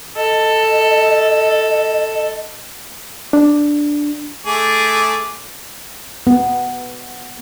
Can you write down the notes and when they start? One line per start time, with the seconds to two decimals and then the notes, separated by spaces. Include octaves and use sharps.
0.17 A4 D#5
3.33 D4
4.46 A3 G#4 D6
6.27 B3